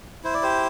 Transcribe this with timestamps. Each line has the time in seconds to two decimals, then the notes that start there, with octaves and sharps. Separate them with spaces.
0.24 E4 C5
0.34 D5
0.42 G4 C5